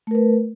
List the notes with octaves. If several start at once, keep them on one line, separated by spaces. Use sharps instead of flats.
A3 A#4 B4